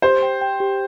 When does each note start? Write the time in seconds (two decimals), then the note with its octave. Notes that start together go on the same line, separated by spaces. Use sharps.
0.02 G4 C5
0.23 G5
0.41 G5
0.60 G4